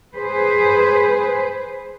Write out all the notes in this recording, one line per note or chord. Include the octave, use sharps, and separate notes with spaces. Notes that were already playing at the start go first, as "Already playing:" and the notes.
G#4 B4 C5